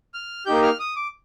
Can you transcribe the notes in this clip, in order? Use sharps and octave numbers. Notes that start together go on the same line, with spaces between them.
F6
A#3 D#4 G4 G6
F6
D#6
D6